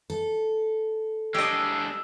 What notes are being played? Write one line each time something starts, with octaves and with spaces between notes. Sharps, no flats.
A4
G#3 D4 G4 D#5 E6